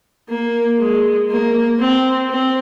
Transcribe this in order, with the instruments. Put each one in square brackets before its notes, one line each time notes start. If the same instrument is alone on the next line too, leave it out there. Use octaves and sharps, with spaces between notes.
[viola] A#3
G#3
A#3
C4
C4